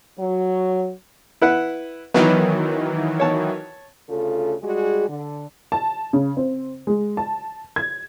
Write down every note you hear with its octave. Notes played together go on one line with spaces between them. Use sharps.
F#3
E4 B4 F#5
D#3 E3 F#3 B3
C#5 A5
D2 C#3 F4 A4
G3 G#3 F#4 G#4
D3
A5
C#3
C4
G#3
A5
G#6